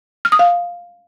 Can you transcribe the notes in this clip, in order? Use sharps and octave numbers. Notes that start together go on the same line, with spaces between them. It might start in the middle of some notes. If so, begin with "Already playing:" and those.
F6
D#6
F5